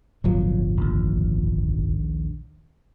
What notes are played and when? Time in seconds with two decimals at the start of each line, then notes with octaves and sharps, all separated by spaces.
0.24 D1 G1 F3 F#3
0.77 A#1 D#2